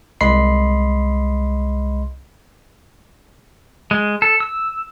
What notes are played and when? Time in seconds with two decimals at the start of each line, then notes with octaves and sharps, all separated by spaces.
0.21 C2 G#3 D#5 B5 C6 C7
3.91 G#3
4.22 A4
4.40 E6